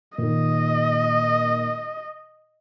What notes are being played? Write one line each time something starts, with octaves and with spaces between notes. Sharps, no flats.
A#2 D#3 D#5